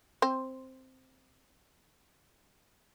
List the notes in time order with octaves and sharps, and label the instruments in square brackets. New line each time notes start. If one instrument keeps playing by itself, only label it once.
[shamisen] C4 C5